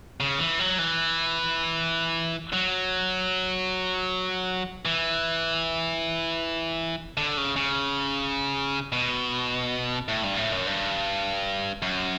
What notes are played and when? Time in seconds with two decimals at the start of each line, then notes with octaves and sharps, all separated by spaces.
0.20 C#3
0.39 E3
0.59 F#3
0.79 E3
2.53 F#3
4.85 E3
7.17 D3
7.37 C#3
7.56 C#3
8.92 B2
10.08 A2
10.23 G2
10.37 A2
10.52 F#2
10.67 G2
11.82 F#2